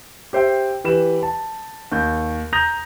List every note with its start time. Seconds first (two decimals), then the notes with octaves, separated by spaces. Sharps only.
0.33 G4 C5 E5 G5
0.84 E3 G4 B4 E7
1.23 A5
1.92 D#2 G6
2.53 A#5 D#6 G6 A#6 F7